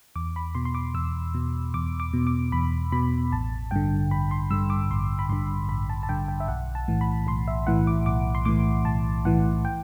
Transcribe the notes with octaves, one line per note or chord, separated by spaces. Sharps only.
E2 D6
B5
B2 C6
C6
D6
E2 E6
B2
E2 D6
D6
B2
D6
E2 B5
B2 B5
A1 A5
G2 D3 G5
A1 B5
C6
G2 D3 E6
D6
A1 C6
B5
G2 D3 C6
A1 B5
A5
A5
G2 D3 G5
G5
E5
B1 F#5
A5
A2 E3
B5
B1 C6
E5
A2 E3 F#5
D6
B1 D6
C6
A2 E3 D6
B1 A5
A2 E3 F#5
G5